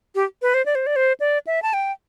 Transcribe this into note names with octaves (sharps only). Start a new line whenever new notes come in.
G4
B4
C5
D5
C5
D5
C5
D5
E5
A5
G5